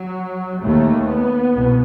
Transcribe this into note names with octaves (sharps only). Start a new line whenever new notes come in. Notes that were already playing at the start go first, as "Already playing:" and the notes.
Already playing: F#3
D#2 A3
B3
C2 B2